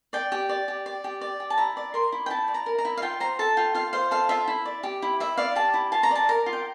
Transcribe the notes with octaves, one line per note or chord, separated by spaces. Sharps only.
D5 G5
G4
D5
G4
D5
G4
D5
G4
A5
E4 A#5
D5
A#4 C6
E4
G5
E4 A5
D5
A#5
A#4
A#5
E4
F5
F4 G5
C5 A#5
A4 A5
F4 G5
F4 F5
C5 F5
A4 F5
F4 E5
E4
D5
G4
E4
E4 E5
D5 F5
G4 A5
E4
F4 A5
A#5
D5 A5
A#4 A#5
F4
G5